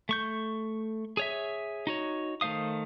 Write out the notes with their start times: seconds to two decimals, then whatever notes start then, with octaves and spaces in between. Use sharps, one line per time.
0.09 A3 C#6 G6
1.17 G#4 C#5 E5
1.87 D#4 F#4 C#5
2.41 D#3 A3 C5 F5 D#6